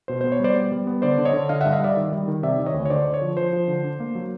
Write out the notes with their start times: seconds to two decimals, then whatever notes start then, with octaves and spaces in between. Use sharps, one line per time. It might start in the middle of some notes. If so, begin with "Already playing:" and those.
0.08 B2 C5
0.21 B3 C5
0.32 C#5
0.40 G3 C5 D5
0.56 B3
0.72 G3
0.87 B3
1.02 D3 C5 D5
1.18 D3
1.25 C#5 D#5
1.33 D3
1.49 D3 D#5 F5
1.61 G2 E5 F#5
1.72 D#5 F5
1.81 G3 D5 E5
1.97 D#3
2.13 G3
2.28 D#3
2.43 C3 D5 E5
2.59 D#3
2.66 C#5 D#5
2.74 D2
2.86 C#5
2.90 D3 C5 D5
3.06 D3
3.14 C#5
3.22 F3
3.37 F3 C5
3.53 F3
3.68 D3
3.84 D4
4.00 A#3
4.15 F#3